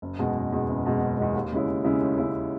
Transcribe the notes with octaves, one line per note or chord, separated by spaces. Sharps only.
F#1
E2 B2 G#3
F#1
E2 B2 G#3
F#1
E2 B2 G#3
F#1
E2 B2 G#3
D#2
C#3 G#3 C#4 E4
D#2
C#3 G#3 C#4 E4
D#2
C#3 G#3 C#4 E4